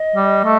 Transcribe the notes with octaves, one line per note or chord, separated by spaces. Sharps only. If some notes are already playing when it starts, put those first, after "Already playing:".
Already playing: D#5
G3
A3